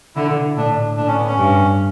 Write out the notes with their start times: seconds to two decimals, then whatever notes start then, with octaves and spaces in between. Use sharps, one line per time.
0.16 D3 E4
0.57 A2 D4
0.97 A2 D4
1.07 C#4
1.17 B3
1.27 C#4
1.38 G2